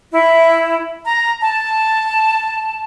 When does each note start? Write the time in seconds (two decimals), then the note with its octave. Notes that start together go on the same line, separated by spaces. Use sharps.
0.12 E4
1.04 A#5
1.42 A5